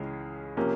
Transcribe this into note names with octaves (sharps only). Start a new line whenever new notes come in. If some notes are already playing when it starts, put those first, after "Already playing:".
Already playing: C#2 C#3 E3 G#3 C#4 G#4
C3 F3 A#3 C#4